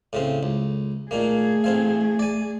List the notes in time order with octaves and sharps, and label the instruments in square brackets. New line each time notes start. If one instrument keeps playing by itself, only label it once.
[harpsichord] A2 C#3 C4
C#2
[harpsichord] A#2 D#3 A#3 [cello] A3 G#4
[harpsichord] A1 C4 F5
D5 G#5